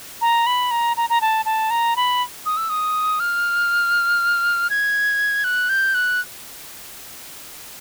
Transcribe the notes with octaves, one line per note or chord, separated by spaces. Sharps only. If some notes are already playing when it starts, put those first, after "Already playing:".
A#5
B5
A#5
A#5
A#5
A5
A5
A#5
B5
D#6
E6
D#6
F6
G#6
F#6
G6
F#6